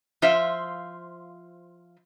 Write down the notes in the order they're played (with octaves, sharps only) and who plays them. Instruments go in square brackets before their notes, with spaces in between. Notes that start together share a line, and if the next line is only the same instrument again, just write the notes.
[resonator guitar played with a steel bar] F3 F4 C5 E5